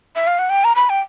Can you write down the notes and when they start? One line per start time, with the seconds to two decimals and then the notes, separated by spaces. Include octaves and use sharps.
0.16 E5
0.27 F5
0.39 F#5
0.50 G5
0.64 A#5
0.76 B5
0.90 G5